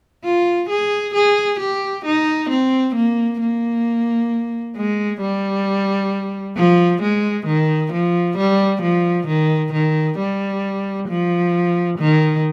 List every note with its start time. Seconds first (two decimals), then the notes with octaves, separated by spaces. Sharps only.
0.24 F4
0.69 G#4
1.14 G#4
1.60 G4
2.05 D#4
2.49 C4
2.95 A#3
3.40 A#3
4.76 G#3
5.21 G3
6.56 F3
7.02 G#3
7.46 D#3
7.93 F3
8.38 G3
8.82 F3
9.28 D#3
9.73 D#3
10.18 G3
11.08 F3
11.99 D#3